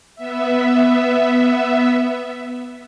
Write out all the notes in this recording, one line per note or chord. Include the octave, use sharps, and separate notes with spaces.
B3 E5